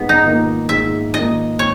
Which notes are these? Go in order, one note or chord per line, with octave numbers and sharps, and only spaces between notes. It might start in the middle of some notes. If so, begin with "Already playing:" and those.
Already playing: G#2 B3
D#4
D#3 A#3
G#2 E5
D#3 A#3 D#5
C#5